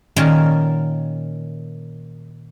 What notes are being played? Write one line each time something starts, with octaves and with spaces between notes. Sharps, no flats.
A#2 D#3 C#4 A#4 A5 A#5